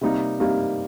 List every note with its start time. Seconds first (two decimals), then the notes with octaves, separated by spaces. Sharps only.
0.01 C3 G3 A#3 D#4
0.39 C3 G3 A#3 D#4